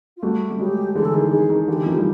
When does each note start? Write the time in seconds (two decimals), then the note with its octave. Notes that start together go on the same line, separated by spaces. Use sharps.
0.17 F4
0.23 G3 A3 F#4
0.51 G3
0.59 F#3 G#3 G4
0.95 D3 E3 G#4
1.05 A4
1.14 D#3 G#4
1.31 D#3 G#4
1.50 D#3
1.68 D3 E3 G4
1.86 D#3 F3
1.98 G3